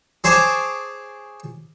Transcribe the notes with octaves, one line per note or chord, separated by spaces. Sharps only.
G#4 C5 C#5 G#5 A5 D6